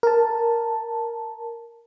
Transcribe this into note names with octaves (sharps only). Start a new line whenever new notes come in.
A#4 A5